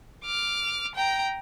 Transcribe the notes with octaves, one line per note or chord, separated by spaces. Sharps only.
D6 F6
G5 A#5